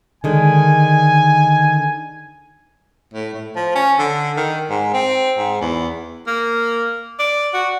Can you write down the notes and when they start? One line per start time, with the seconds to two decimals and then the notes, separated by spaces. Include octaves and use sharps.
0.24 D3 D#3 G#3 G#5
3.14 A2
3.34 A2
3.56 F3
3.75 C#4
3.99 D3
4.37 D#3
4.70 G#2
4.94 C4
5.38 G#2
5.61 E2
6.27 A#3
7.19 D5
7.54 F#4